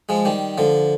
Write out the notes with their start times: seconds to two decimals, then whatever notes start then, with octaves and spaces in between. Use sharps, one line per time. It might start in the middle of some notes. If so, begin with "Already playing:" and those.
0.09 F3 G#3
0.25 D#3 G3
0.58 D3 F3